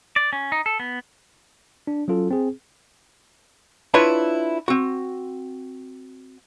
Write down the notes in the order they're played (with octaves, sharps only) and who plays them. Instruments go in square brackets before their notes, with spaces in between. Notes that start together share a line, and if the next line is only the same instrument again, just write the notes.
[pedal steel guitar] D5
C#4
D#4
A4
B3
[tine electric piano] D4
F#3 C#4 F4 A4
C4 G#4
[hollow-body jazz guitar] D4 E4 F4 B4 C#5 E5
C4 F#4